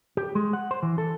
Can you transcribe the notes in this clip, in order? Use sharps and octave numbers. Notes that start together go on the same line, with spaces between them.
G4
G#3
F#5
C5
E3
A4